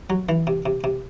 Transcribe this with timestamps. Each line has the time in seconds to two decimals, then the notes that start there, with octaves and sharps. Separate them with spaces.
0.10 F#3
0.29 E3
0.47 C3
0.66 C3
0.84 C3